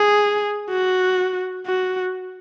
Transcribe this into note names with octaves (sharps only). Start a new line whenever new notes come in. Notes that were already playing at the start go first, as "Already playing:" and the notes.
Already playing: G#4
F#4
F#4